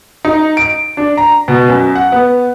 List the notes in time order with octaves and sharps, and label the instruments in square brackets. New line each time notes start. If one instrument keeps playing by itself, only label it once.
[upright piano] D#4
D7
D4
A#5
B2
F#2
F#5
B3